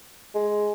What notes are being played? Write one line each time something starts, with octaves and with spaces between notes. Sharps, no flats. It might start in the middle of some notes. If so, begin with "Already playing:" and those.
G#3